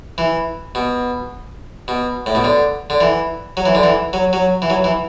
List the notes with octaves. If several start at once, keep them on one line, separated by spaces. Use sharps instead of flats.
E3
B2
B2
A2
B2
D3
D3
E3
F#3
E3
D3
E3
F#3
F#3
E3
F#3
E3